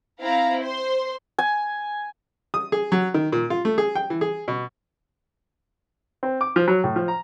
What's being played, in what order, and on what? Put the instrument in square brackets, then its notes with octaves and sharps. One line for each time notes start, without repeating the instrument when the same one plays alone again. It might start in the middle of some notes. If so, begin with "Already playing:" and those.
[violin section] C4 E4 F5 A#5
C5 C6
[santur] G#5
[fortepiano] D#6
G#4
F#3
D#3
A#2
F4
A3
G#4
G5
E3
G#4
B2
C4
D6
F3
F#3
A2
F3
A#5